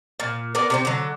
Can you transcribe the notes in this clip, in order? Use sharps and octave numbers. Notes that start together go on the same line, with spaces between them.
A#2
B3 A#4 D5
C3 C4 C5
D3 F#3